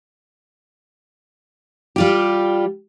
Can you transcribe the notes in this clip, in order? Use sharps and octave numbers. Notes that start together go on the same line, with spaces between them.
G3 F4 G4